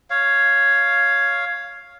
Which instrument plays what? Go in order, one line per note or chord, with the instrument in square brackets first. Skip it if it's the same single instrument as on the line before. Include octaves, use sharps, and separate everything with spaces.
[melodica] C#5 F5